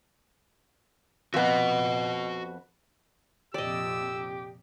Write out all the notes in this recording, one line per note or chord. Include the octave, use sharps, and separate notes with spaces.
F2 B3 F#4 D#5
A#1 F2 C3 G4 D5 D#5 E6